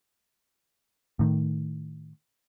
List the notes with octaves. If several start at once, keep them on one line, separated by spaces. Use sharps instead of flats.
A2 D#3